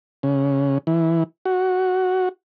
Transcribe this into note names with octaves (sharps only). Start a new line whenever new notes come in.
C#3
E3
F#4